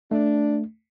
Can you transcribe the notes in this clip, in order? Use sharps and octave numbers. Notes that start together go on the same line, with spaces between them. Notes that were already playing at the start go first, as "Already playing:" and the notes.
A3 D4